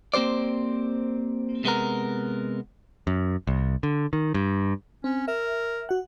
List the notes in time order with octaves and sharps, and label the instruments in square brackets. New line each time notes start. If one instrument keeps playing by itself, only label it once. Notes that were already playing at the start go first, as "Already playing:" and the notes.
[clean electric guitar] A#3 C4 G4 C5 D5
C3 G#3 B3 A#4
[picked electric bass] F#2
C2
D3
D#3
G2
[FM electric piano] C4 [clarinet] C#4
[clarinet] A#4 [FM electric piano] E5
[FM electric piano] F#4 F#5